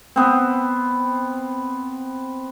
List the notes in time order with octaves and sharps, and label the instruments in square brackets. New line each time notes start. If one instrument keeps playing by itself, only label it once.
[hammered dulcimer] B3 C4